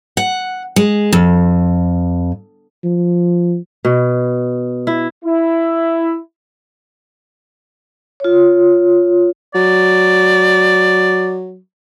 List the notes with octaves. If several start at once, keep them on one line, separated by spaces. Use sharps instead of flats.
F#5
G#3
F2
F3
B2
E4
E4
F4 C#5
F#3 D5